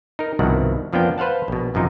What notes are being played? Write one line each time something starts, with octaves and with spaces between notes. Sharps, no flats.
D#4 A#4
C2 G2 B2 D#3 F3 F#5
F2 F3 A#3 B3 D4 G5
B4 C5 F5 F#5 A5
A#1 B2
G1 F#2 C3 F3 D#4 A#4